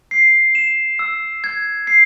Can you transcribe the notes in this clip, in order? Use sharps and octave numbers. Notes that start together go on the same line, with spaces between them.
C7
E7
E6
G#6
C7